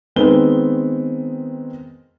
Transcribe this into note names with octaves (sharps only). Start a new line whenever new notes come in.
D#3 G#3 B3 C4 G7